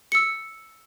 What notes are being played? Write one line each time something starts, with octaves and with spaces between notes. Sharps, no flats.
E6 C#7